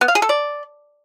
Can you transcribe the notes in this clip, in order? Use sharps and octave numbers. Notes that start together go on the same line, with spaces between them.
B3
F5
G#4
A4
D5